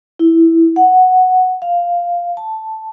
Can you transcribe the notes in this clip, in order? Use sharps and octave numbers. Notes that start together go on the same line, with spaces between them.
E4
F#5
F5
A5